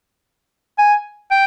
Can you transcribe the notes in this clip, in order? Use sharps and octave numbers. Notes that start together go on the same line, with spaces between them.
G#5
G5